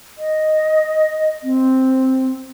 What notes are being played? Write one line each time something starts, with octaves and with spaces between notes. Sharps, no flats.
D#5
C4